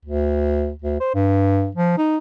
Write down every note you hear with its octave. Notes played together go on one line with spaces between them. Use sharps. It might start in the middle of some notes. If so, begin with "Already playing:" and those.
D2
D2
C5
G2
F3
D#4